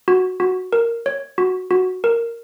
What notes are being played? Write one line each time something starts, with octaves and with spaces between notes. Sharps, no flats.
F#4
F#4
A#4
C#5
F#4
F#4
A#4